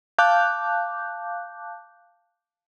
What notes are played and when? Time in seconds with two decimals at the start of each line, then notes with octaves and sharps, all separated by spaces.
0.18 F5 A5 D6 F#6 G6